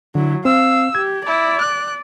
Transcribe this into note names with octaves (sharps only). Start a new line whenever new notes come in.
D3 F#3 E4
C4 F5 E6
G4 G#6
E4 D5
F#6